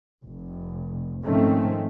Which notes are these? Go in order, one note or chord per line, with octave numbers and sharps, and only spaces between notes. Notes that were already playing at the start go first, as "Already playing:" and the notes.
F1
G#2 D#3 F3 A3 C4 C#4